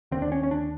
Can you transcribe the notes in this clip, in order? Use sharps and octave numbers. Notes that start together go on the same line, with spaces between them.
D#2 D3 C4
D4
C#4
C#4
D4